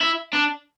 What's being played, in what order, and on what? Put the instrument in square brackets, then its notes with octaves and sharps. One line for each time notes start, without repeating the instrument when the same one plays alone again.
[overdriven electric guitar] E4
D4